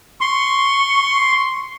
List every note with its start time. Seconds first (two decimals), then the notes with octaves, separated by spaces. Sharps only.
0.21 C6 C#6